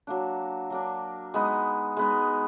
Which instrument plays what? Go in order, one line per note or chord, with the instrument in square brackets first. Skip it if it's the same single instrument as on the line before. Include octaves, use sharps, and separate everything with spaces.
[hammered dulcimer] F#3 A#3 D4
F#3 A#3 D4
G#3 B3 D#4
G#3 B3 D#4